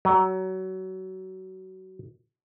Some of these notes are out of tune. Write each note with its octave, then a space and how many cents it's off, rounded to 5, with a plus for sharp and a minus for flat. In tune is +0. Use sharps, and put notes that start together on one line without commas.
F#3 +25